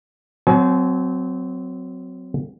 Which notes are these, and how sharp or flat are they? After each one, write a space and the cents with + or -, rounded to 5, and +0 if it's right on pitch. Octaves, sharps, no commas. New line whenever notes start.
F#3 +0 C4 -25 G#5 +45